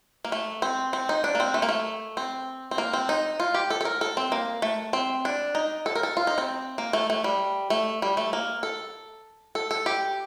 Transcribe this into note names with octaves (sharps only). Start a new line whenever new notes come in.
A#3
A3
C4
C4
D#4
D4
A#3
C4
A3
A#3
A3
C4
C4
A#3
C4
D#4
F4
G4
A4
A4
A#4
A4
C4
A#3
A3
C4
D4
D#4
A4
A#4
A4
F4
D#4
C4
A#3
A3
A3
G3
A3
G3
A3
A#3
A4
A4
A4
G4